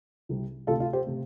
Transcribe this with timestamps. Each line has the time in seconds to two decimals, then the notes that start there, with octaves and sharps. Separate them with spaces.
0.29 C2 C3 G3
0.67 D2 C3 A3 F4 A4
0.80 F4
0.93 G4 C5
1.06 C3 A3